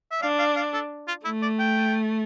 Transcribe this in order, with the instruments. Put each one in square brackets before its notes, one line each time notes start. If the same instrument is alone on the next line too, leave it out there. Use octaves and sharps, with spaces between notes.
[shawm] E5
[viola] D4 [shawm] F5
[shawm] F5
F5
A4
F4
[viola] A3 [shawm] E4
[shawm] D5
G5